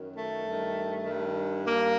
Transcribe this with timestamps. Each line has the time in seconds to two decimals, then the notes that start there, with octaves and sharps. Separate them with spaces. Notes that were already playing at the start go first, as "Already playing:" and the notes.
Already playing: F#2 D#3
0.16 A3
0.45 G2 D#3
1.05 G2 D#3
1.64 G2 D#3 A#3